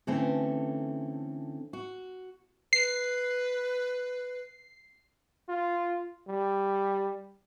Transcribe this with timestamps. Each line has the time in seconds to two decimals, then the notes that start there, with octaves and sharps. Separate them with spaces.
0.07 D3 E3 A3 C4 C#4
1.73 F#4
2.73 B4 C7
5.49 F4
6.28 G3